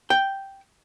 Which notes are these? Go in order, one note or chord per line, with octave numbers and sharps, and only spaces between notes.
G5